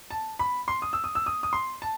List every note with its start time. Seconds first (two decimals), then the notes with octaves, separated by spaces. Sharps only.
0.10 A5
0.39 B5
0.68 C6
0.82 D#6
0.93 E6
1.04 D#6
1.15 E6
1.26 D#6
1.43 D#6
1.53 C6
1.82 A5